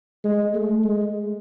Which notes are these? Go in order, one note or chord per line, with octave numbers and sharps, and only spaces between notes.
G#3
A3
G#3